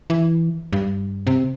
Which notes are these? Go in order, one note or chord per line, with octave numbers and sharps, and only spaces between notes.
E3
G2
C3